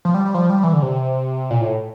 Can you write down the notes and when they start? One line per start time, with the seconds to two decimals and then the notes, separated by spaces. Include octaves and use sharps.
0.05 F3
0.14 G3
0.25 G3
0.34 F3
0.50 G3
0.64 E3
0.73 D3
0.82 C3
1.50 A#2
1.61 A2